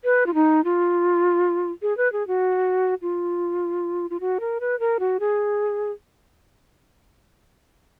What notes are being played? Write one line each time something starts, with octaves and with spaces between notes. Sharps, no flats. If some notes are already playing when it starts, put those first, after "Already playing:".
B4
F4
D#4
F4
G#4
B4
G#4
F#4
F4
F4
F#4
A#4
B4
A#4
F#4
G#4